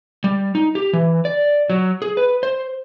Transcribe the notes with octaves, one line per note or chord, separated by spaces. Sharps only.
G3
D#4
G4
E3
D5
F#3
G#4
B4
C5